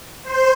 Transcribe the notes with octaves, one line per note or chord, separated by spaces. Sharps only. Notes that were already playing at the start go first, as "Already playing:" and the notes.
C5